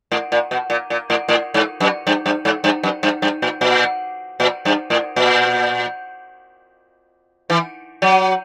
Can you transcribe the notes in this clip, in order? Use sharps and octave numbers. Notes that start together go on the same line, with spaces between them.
A2
A#2
B2
A#2
A#2
A2
A2
G#2
F#2
G2
G2
G#2
G2
F#2
G2
G2
A#2
A#2
A#2
G2
A2
A#2
E3
F#3